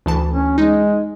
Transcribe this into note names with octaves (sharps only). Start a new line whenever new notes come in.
D2 E3 A5
C#4
G#3 D#4